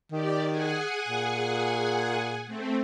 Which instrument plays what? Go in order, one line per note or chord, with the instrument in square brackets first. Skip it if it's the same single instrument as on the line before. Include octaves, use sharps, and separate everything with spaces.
[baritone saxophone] D#3 [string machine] G4 D5
[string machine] G#4 F#5 G#5
[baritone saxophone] A#2
[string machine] A3 C4